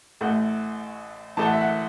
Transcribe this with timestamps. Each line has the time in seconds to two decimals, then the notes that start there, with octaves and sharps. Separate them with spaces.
0.21 A1 A2 A3 F#5
1.37 A1 A2 E3 A3 A5
1.45 F#5
1.53 E5
1.61 F#5